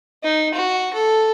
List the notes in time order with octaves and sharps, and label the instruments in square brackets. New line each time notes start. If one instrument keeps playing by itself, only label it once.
[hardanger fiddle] D#4
F#4
A4